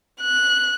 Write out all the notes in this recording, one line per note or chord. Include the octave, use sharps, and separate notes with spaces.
F#6